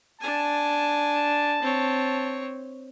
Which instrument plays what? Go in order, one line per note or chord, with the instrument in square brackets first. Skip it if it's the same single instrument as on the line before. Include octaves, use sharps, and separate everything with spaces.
[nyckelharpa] D4 G#5 [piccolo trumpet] A5
[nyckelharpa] C4 C#5